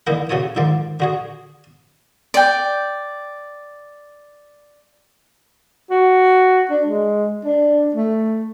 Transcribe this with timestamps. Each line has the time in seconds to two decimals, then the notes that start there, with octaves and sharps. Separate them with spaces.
0.07 D3 E3 A#3 D#4 E4 A#4
0.29 C#3 F#4 A4 C#5 D#6
0.56 G#2 D3 D#3 F3 D5
1.00 D3 F#4 G#4
2.34 D5 G5
5.90 F#4
6.70 D4
6.87 G#3
7.45 D4
7.94 A3